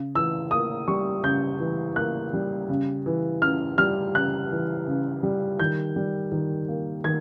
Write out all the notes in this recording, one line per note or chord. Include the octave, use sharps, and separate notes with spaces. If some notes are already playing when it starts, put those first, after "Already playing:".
Already playing: C#3
E3 E6
A#3 D#6
G3 C#6
C#3 G6
E3
A#3 F#6
G3
C#3
E3
C#3 F6
G3 F6
C#3 F#6
E3
C#3
G3
D#3 G6
G3
D#3
A#3
D#3 G#6